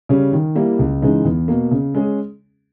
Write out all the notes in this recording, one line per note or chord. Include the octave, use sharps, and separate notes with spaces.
C#3 G3 C#4
D#3
G3 A#3 E4
C#2
C#3 E3 G#3 D#4
E2
B2 A#3
C#3
G#3 C#4 G#4